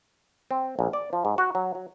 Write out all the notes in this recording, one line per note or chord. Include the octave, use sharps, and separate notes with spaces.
C4
A#1
D5
F3
G#2
F#4
F#3
F#3